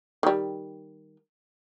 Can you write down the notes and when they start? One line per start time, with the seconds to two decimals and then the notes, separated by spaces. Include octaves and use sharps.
0.23 D#3 G3